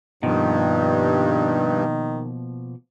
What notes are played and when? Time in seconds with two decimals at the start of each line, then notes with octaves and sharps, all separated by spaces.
0.23 G2 B2 D#3 F3 A#3